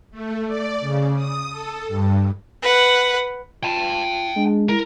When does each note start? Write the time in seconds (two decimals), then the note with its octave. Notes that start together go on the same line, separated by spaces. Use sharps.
0.11 A3
0.47 D5
0.80 C#3
1.15 D#6
1.50 A4
1.87 G2
2.63 B4 F#5
3.63 F4 G5 A5
4.36 G#3 D4
4.69 E4 A#4